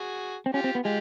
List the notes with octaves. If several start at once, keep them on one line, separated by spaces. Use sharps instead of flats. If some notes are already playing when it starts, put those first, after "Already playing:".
Already playing: F#4 G#4
C4
C#4 F4 G4
C4
B3
G#3 F4 G4